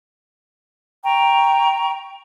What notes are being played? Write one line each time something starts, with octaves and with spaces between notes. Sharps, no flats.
G5 A#5 C#6